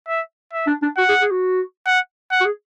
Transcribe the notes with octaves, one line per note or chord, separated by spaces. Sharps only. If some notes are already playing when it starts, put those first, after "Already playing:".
E5
E5
D4
D4
F#4 F#5
G#4
G#4
F#4
F#5
F#5
F#4
G#4